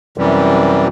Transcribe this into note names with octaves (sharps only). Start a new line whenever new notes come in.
F#2 C3 E3 G3